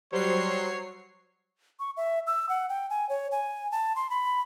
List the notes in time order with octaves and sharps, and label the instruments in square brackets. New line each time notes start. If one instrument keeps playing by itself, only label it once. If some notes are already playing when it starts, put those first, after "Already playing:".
[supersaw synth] F#3 C7 [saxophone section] G3 C5 [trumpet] C#5
[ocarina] C#6
E5
E6
F#5
G5
G#5
C#5
G#5
A5
C6
B5